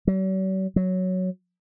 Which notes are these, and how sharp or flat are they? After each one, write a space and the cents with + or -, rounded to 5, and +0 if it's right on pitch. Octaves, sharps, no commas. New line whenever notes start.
F#3 +45
F#3 +0